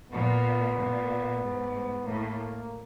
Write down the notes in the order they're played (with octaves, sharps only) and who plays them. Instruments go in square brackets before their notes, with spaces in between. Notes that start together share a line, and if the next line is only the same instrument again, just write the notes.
[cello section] A#2 [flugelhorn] B3
[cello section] A#2
G#2
[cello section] A2 [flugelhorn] A#3